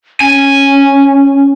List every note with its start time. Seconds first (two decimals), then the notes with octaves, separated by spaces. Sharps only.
0.20 C#4 G#5